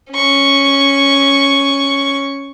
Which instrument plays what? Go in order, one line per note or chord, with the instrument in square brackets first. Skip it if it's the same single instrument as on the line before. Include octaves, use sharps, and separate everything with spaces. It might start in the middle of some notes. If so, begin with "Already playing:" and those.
[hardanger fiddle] C#4 C#6